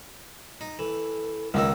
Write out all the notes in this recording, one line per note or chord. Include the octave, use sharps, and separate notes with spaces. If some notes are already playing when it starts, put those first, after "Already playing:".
D#4
E3 A4
C#2 D#3 A#3 D#4 E6